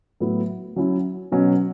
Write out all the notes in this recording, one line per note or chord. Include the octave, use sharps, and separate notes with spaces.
A2 F#3 B3 E4
F#3 C#4 E4
B2 F#3 C#4